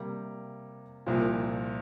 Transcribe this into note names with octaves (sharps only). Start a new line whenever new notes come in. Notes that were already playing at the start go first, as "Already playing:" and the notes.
Already playing: C3 G3 A#3
C2 A#2 F3 A#3